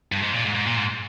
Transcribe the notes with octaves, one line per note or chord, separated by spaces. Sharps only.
G2
G#2
A#2
G#2
G#2
A#2
G#2